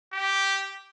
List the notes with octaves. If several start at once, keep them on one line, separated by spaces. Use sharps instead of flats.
G4